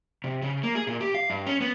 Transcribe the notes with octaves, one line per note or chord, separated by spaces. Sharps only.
C3
C#3
A#3
G#4
A#2
G4
F5
G2
C#4
B3